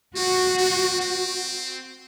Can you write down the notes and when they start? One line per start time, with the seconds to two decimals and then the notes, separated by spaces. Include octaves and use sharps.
0.16 C4 F#4
0.58 C4
1.01 C4